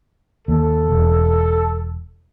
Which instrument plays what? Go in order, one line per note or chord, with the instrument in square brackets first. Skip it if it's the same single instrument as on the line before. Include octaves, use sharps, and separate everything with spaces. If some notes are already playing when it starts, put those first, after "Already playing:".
[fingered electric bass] D#2 [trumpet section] A4
[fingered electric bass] E1